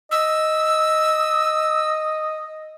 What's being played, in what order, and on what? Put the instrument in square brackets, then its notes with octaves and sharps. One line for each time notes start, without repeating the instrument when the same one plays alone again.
[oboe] D#5 [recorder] E6